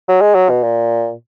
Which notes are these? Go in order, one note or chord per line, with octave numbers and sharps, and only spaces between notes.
F#3
G#3
F#3
B2
A#2